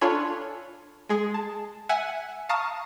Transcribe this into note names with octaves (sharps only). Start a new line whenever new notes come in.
D4 F4 A4 C#5 G#5 B5
G#3 G#4
A5
E5 F#5 G#5
F5 A5 A#5 C#6 D#6 F6